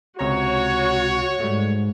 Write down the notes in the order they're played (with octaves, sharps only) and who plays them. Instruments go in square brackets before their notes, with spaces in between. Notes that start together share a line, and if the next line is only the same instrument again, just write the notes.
[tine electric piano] C#2 C3 A#5 [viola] F#4 [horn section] C#5
[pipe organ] G#2 [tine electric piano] G3 A3